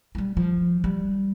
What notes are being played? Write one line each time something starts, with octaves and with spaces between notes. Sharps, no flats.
F#3 G3
F3
G3